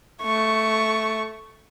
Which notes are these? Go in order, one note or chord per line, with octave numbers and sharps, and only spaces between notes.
A3 C#6